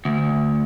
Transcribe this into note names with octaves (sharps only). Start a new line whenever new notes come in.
D2